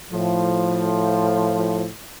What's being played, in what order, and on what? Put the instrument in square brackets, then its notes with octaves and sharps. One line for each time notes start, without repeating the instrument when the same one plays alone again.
[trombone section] A2 F3